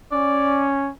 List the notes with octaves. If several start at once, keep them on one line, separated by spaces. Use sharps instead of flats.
C#4 D5